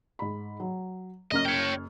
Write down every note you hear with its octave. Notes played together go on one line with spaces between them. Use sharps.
G#2 B5
F#3
F#1 F#2 D#5 F6
C#5 G5